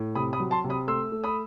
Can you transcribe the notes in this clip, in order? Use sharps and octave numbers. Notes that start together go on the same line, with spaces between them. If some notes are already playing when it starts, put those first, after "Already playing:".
Already playing: A2
C3 B5 D#6
B5 D#6
F#3
A5 C6
C3
B5 D#6
A3 C6 E6
A3
B5 D#6